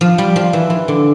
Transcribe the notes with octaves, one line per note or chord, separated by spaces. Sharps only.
F3
G3
F3
E3
E3
D3